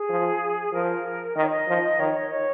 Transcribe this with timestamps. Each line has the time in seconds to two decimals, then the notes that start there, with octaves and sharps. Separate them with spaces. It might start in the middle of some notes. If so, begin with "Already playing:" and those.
Already playing: G#4
0.09 F3
0.73 F3 A#4
1.36 D#3 D#5
1.44 C#5
1.50 D#5
1.68 F3
1.99 D#3 C#5
2.31 C#5